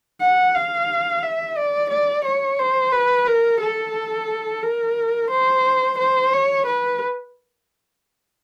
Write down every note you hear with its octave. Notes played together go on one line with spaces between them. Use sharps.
F#5
F5
E5
D5
D5
C#5
C5
B4
A#4
A4
A#4
C5
C5
C#5
B4